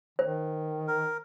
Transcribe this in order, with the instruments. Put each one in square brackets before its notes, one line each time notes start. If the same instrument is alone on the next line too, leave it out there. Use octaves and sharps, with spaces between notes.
[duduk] D#3 [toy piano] C5
[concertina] A#4